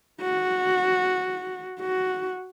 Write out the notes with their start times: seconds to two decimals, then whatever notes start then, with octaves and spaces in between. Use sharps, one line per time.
0.21 F#4
1.80 F#4